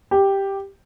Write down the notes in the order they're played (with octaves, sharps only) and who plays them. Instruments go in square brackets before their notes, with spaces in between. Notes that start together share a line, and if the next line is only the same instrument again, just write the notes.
[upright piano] G4